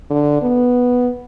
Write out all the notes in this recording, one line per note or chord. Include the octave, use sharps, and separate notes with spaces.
D3
B3